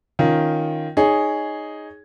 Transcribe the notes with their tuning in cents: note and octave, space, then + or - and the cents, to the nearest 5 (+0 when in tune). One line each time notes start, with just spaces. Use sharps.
D#3 +0 C#4 +0 F4 +0
D#4 +0 G#4 +0 C#5 +10